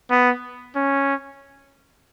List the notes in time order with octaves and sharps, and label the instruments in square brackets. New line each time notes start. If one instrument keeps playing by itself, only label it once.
[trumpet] B3
C#4